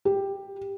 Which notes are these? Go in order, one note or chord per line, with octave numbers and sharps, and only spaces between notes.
G4